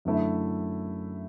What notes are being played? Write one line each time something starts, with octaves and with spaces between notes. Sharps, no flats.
F#2 D3 A3 E4